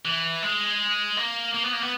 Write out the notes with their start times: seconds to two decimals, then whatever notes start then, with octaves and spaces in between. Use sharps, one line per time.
0.05 E3
0.42 G#3
1.17 A#3
1.54 A#3
1.64 B3
1.73 A#3
1.82 B3